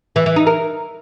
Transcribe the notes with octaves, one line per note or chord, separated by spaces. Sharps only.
E3
E3
D#4
A#4